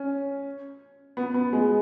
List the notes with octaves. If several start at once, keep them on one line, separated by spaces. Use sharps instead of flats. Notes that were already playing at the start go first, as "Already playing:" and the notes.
Already playing: C#4
B3
B3
G#3